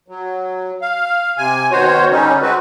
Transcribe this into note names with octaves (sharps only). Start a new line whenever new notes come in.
F#3
F5
C3 G#5
B2 D#3 F#4 C5 C#5
D3 G3 C#4 D#4
G#3 C4 F#4 B4